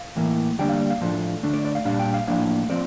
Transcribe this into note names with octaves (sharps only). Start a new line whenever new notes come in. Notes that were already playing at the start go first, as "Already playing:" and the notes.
Already playing: F5
A2 E3 A#3
D3 G3 A#3 D4 G5
F5
F5
A2 F3 A3 D4
D3 A3 D4
D5
D5
F5
A#2 G3 D4 F5
G5
F5
A2 F3 A#3 D4 F5
F3 C4 D5